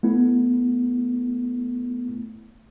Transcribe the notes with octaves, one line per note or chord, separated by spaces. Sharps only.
A3 B3 E4